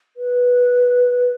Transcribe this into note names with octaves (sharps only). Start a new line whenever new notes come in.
B4